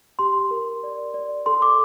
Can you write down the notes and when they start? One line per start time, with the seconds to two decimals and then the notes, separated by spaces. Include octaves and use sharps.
0.19 G4 C6
0.51 A#4
0.83 D5
1.14 D5
1.46 A4 C6
1.62 D6